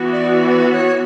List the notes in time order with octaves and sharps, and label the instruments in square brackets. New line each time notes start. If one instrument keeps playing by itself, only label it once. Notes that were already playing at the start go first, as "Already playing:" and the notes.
Already playing: [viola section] E3 B3 F#4
[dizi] D5
B4
C#5